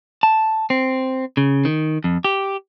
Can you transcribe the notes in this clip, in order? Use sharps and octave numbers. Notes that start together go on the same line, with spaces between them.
A5
C4
C#3
D#3
F2
G4